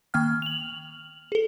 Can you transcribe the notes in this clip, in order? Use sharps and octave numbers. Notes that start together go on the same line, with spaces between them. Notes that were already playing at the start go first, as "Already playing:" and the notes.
D#3 A#3 G5 F6
F7 F#7
G#4 A4